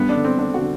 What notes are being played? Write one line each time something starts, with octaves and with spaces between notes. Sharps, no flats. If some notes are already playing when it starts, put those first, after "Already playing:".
Already playing: G2 B3
D4
D3
C4
D3 D4
F#4
D3